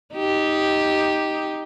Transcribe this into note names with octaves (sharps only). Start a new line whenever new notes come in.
D#4 G4